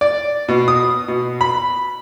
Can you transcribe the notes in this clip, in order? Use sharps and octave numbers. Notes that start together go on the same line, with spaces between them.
D5
B2
D#6
B2
B5